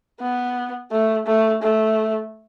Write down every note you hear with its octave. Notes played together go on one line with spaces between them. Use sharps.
B3
A3
A3
A3